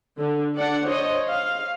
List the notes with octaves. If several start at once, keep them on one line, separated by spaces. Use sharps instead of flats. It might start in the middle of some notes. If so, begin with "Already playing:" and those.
D3
D4 D5 F#5
C5 C#5 D#5
F5